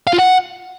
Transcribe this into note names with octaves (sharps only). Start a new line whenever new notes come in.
F5
F4
F#5